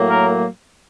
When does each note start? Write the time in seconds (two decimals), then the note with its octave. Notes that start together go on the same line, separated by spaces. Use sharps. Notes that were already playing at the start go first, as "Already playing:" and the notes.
Already playing: A2 F#3 A#3
0.10 A#4